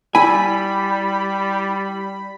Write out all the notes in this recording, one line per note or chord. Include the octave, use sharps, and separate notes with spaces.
G3 E4 G#5 B5